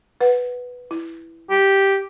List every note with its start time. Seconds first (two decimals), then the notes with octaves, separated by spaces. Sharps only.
0.21 B4 F#5
0.91 E4
1.50 G4